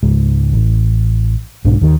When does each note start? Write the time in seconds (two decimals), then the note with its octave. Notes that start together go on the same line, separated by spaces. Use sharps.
0.03 C#2 G#2
0.53 A1
1.65 B1 G#2 D4
1.81 D#2 D#3